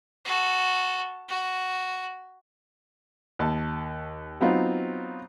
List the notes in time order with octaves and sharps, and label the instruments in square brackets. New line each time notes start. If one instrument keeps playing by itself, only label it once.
[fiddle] F#4 A4
F#4
[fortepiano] D#2 A5
F#3 B3 C4 D#4 F4